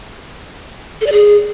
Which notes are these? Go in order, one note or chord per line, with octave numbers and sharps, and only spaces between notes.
A4
D5
G#4